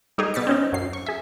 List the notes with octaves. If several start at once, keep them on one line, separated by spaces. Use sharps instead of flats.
G3 D#4 G4 G#4
B2 A6 B6 C#7
C4 C#4 D#4
F#2 F#3 C7
C#6
G#4 E5